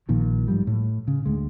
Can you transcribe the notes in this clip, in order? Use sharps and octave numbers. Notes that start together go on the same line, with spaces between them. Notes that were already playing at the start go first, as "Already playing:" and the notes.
A#1 A#2 D#3 F3
G#2 F3 G3
A2
C#3
D2 G#3